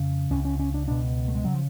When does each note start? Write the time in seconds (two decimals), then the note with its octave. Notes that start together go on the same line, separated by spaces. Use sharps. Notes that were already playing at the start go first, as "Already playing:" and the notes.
Already playing: F2 C#3
0.31 C#2 C#3 C#4
0.45 C#4
0.60 C#4
0.74 D4
0.87 C#2 B2 D4
1.28 A3
1.35 G#3
1.44 C#3 F#3
1.54 F3